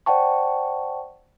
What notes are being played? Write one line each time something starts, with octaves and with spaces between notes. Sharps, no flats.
C5 D5 F#5 G5 A5 C#6